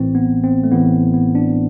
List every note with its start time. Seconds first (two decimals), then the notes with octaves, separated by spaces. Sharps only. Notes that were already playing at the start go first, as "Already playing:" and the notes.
Already playing: A1 A2 E3 C4
0.15 B3
0.44 C4
0.64 A3
0.71 A1 A2 E3 B3
1.14 B3
1.35 D4